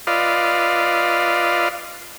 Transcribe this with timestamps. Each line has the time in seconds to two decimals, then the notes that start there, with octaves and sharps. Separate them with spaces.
0.07 F4 B4 D5 D#5 F5